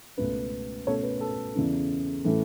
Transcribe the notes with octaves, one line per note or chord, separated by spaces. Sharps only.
C#2 B2 A3 C#4 B4
B2 A3 C#4 A4 C#5
B4
A4
E2 C#3 E3 C#4
A2 E3 A3 C#4